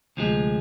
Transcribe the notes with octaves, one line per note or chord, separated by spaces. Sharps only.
D2 C3 F3 G#3